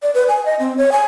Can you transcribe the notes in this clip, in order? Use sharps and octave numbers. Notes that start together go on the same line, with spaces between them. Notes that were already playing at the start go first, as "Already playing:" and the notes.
D5
B4
G#5
D#5
C4
C#5
G#5